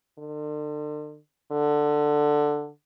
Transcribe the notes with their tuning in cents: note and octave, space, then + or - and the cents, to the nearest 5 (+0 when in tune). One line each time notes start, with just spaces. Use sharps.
D3 +40
D3 +10